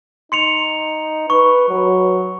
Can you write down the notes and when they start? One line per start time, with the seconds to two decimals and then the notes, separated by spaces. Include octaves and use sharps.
0.32 D#4 C6 C#7 F7
1.30 B4 C#6
1.69 F#3